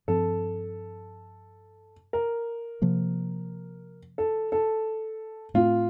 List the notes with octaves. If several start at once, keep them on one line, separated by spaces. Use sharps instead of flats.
G2 F3 C4 A4
A#4
C3 F3 A#3
A4
A4
A2 A3 C4 F4